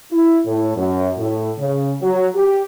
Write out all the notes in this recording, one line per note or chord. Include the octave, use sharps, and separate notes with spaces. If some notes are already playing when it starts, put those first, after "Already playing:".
E4
A2
F#2
A2
C#3
F#3
G4